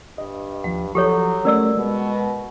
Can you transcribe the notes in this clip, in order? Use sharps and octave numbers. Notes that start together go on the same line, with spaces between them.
G2 D#5
D#2 F3 F#5
F3 F#3 G4 A4 C#5
G3 A3 C#4 A#4 D5 E6
B2 G#3